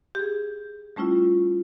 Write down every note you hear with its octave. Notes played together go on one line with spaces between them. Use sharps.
G4 G#4
G3 A3 C#4 E4 F4